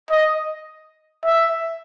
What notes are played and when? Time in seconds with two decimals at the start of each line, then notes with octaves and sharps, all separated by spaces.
0.10 D#5
1.24 E5